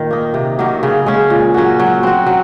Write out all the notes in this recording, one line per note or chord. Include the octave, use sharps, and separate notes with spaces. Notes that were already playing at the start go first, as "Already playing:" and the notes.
Already playing: A#2 D#3
A#3 D#4
C3
D#3 F#3 A#3
C#3
G#3 C#4
A#2
F#3 C#4 F#4
F#3
C4 F#4
F#3